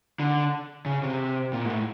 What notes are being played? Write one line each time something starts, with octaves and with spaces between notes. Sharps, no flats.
D3
C#3
C3
A#2
G#2
A2